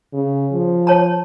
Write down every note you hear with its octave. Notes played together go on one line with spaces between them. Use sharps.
C#3
F3
C#5 A5 A#5